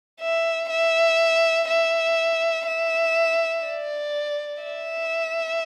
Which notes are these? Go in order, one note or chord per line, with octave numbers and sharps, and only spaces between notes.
E5
E5
E5
E5
D5
E5